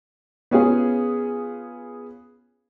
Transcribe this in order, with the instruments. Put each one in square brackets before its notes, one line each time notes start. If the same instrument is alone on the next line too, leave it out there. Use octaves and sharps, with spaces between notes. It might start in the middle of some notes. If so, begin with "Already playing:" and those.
[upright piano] B3 C#4 F4 G#4